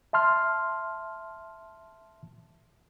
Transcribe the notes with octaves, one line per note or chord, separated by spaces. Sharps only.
E5 A5 C6 F6